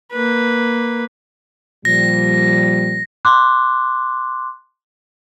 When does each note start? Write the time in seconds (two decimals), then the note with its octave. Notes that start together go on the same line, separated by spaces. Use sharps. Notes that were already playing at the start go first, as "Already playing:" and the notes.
0.13 A#3 B4
1.85 A#2 F3 G3 A#6
3.25 C6 D6 F#6